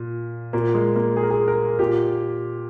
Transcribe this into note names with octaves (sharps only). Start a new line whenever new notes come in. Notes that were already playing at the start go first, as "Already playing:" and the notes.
Already playing: A#2
A#2 A#3
G#3
A#3
G#4
A#4
G#4
A#4
A#2 G4